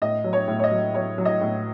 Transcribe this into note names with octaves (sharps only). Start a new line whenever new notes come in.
A2 D#5
F#3
C#5
A2
C#5
D#5
F#3
F#3 C#5
F#3
D#5
A2